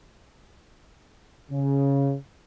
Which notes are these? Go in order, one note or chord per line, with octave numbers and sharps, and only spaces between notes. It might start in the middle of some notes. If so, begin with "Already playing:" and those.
C#3